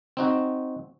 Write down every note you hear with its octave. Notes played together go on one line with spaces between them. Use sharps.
C4 D#4 F#4